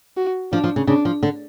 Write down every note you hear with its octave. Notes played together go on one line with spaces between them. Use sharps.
F#4
F3 D4
F3
C#3
C#3 D4
F3
D3